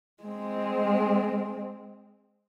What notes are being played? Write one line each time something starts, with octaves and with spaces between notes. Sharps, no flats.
G#3 C4